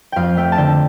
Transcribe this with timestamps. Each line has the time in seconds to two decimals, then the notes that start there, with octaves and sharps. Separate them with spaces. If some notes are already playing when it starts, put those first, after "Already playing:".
0.12 F2 F5 G5
0.37 A3 G5
0.52 A5
0.57 D3 G5